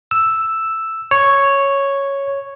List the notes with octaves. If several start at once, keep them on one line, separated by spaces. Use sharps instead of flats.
E6
C#5